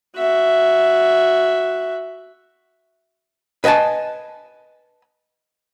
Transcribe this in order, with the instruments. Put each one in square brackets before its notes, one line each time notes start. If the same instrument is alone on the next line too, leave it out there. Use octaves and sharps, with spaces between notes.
[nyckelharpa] F#4 E5
[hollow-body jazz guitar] B4 D#5 E5 G#5 A5